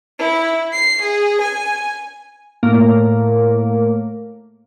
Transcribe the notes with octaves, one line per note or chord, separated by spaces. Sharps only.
E4
C7
G#4
G#5
A2 A#3